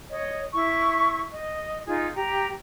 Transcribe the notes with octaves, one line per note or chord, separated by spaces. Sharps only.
C#5 D#5
E4 C#6
D#5
D#4 F4 G#4
G4 A#5